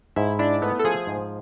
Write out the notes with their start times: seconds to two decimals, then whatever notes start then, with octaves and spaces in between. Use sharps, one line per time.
0.16 G#2 E4
0.39 D4 E4
0.62 A3 B3
0.79 A4
0.84 F3 G#4
1.07 G#2